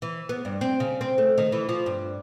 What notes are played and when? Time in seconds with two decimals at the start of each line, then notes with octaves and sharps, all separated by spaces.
0.02 E3
0.29 B3
0.45 G2
0.61 C4
0.80 C#3
1.01 C4
1.18 A3
1.38 D#3
1.52 E3
1.69 F3
1.86 G2